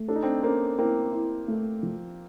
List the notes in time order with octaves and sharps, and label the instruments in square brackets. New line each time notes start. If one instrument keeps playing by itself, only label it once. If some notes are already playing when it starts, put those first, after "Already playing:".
Already playing: [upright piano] A3
[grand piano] D4 [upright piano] A4
[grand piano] D#4
C4 D4
[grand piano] A#3 C4 [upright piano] C#4
[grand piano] A#3 C4 [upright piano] E4
[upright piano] E4
A3
F3